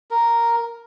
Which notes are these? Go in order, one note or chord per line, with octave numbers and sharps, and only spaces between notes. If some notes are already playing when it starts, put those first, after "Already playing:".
A#4